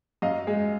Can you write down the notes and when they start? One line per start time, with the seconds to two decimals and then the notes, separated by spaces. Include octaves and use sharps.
0.22 F#2 D#5 F5
0.47 G#3